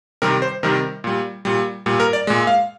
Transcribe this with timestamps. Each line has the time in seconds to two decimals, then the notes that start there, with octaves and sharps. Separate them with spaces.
0.22 C3 D#3 G3 A#4
0.42 C5
0.63 C3 D#3 G3 A#4
1.04 A#2 G3
1.45 A#2 G3
1.86 A#2 G3
2.00 A#4
2.13 D5
2.27 A#2 G#3
2.47 F5